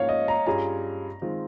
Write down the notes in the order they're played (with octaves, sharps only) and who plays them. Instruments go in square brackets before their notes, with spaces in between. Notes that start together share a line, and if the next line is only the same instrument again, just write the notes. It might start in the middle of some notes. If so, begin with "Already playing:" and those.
Already playing: [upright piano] G#2 F3 A#3 C#4 [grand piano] C#5 F5
[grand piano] D#5
A#5
[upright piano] G2 G3 C#4 F4 G#4 [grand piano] A#5
[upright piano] D#3 G#3 C4 F4